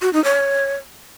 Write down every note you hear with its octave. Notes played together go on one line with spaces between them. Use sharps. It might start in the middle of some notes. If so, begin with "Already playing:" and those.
F#4
D#4
C#5